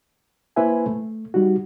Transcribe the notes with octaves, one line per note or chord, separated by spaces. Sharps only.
A#3 E4 B4 C5 E5 G#5
A3
G3 D#4 F#4